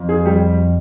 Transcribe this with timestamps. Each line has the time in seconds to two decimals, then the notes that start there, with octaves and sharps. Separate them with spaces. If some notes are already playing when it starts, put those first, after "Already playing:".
Already playing: F2
0.09 G#4
0.25 G3